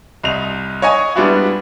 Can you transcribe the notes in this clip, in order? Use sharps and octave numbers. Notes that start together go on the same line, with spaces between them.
C2 D#5 F7
C#5 D#5 G#5
G3 G#3 B3 D4 E4 F#4